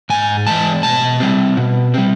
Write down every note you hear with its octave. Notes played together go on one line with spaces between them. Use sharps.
G#2 G#5
E3 G#3 A5
B2 A5
G3 C4
B2
G3 C4